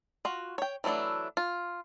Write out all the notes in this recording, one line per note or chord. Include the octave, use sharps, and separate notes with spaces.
F4 F#4
C#5 G5
E3 F#3 A3 D4 E4
F4